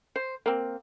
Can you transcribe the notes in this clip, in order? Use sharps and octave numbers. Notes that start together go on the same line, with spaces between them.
C5
A#3 C4